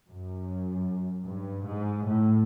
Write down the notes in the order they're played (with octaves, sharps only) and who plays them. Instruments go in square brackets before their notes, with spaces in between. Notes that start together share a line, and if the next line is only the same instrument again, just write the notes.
[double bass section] F#2
G2
G#2
A2